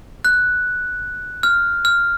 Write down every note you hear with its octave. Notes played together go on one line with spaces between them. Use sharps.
F#6
F6
F6